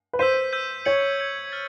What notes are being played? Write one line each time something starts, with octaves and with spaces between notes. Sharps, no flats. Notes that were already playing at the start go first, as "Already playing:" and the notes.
B4
C5 E6 G6 B6 D#7
E6 G6 B6 D#7
C#5 G#6 C#7 F#7
G#6 C#7 F#7
F6 A6